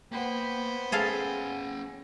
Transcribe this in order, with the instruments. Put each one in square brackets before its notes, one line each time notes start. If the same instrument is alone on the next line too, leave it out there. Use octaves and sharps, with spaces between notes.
[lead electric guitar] A#3 [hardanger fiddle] B3 C5 [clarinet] G5
[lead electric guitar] C#4 G5 [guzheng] G#4 A4 F5 [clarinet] G#5